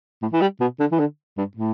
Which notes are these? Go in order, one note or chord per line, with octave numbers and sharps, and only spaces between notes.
A2
E3
G3
B2
D3
E3
D3
G2
A2